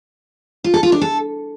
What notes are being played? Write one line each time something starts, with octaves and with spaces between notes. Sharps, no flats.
F4
A4
F4
D4
A4